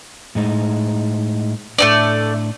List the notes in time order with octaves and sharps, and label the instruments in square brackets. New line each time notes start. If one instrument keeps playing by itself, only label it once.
[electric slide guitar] A2 G#3 D#4
[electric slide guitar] A2 D4 [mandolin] A3 C4 D5